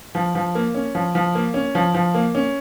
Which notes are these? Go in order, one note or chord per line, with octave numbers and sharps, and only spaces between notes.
F3
F3
A#3
C#4
F3
F3
A#3
C#4
F3
F3
A#3
C#4